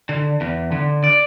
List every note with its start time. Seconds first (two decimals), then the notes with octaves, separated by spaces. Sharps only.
0.09 D3
0.41 E2
0.72 D3
1.04 D5